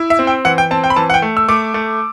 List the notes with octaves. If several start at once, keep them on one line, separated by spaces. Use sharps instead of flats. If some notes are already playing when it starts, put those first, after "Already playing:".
Already playing: E4
E5
C4
G5
E3 F#5
G5
C4 A5
G5
B5
E3 A5
F#5
G5
A3
E6
A3 D6
A3